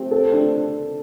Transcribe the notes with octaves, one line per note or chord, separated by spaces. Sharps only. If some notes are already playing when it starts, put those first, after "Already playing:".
Already playing: A3 C4 G4
A4
D4